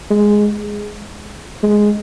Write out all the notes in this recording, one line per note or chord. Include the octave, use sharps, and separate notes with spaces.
G#3
G#3